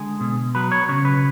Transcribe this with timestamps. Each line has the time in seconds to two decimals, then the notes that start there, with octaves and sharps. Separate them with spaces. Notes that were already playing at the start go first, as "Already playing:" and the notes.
Already playing: D3 G#3 G#4
0.20 B2
0.55 F#3 B4
0.72 C#5
0.89 C#3 C#5
1.05 B4